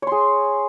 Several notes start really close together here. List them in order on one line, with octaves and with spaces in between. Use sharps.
C#5 C6 G#4